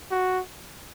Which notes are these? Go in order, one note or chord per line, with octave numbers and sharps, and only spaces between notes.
F#4